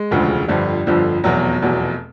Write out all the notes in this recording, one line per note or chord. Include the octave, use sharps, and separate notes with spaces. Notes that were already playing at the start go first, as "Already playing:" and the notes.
Already playing: G#3
E1 D2 C#3 F3
G1 F2 D3 F3 G3
G1 F2 D3 F3
F1 E2 B2 F#3
F1 E2 B2